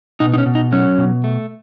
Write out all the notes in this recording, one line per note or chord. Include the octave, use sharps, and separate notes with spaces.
B2 D#4
D#4
C#4
B2
D#4
F#3 C#4
B2
A3